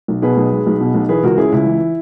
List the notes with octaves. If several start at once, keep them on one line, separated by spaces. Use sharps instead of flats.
B1
B2 G#4 B4
B1
G#3
B1
B2
B1
E3 G#4 B4
C#2 F#4 A#4
C#3 E4 G#4
C#2 E4
E3